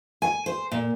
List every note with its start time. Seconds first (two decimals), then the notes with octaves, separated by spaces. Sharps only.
0.22 G#5
0.46 C5
0.71 A#2